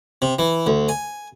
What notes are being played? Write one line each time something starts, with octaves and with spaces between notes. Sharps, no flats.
C3
E3
D2
G#5